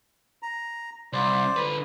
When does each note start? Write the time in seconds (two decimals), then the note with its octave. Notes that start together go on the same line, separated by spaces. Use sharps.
0.42 A#5
1.13 C2 C5 D5
1.56 D3 B4